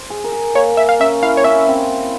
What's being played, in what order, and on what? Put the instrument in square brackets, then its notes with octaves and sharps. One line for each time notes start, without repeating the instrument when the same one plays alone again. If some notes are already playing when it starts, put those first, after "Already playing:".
Already playing: [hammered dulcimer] C5
G#4
A#4
G#4
[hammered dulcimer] A#3 [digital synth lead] C#5
[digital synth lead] E5
F5
[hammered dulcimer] C#4 [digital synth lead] E5
[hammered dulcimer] E4 [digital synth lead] F5
[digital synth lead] C#5
[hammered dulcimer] C#4 [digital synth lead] E5
[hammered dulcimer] C4